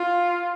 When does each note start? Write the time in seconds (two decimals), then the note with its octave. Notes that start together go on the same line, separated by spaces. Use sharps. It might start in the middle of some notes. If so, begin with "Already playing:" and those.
Already playing: F4